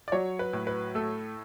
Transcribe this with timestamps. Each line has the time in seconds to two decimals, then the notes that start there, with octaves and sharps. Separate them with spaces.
0.08 D5
0.12 F#3 C#5
0.39 B4
0.53 A2
0.67 B4
0.95 A3 A4